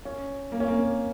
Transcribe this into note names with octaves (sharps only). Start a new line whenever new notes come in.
C#4
A#3
C#4
A#3